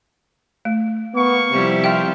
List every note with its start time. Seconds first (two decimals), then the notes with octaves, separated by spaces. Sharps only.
0.65 A3
1.14 A#3 B3 C#6
1.51 C3 F3 G3 E4
1.84 F4 A#4 C5 E5 G5